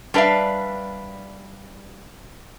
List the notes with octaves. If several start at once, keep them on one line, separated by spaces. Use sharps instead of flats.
G3 D4 B4 E5 F5